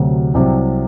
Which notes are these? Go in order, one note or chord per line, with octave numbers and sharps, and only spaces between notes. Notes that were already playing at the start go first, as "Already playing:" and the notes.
Already playing: D2 C3 F#3
C2 C3 F#3 C4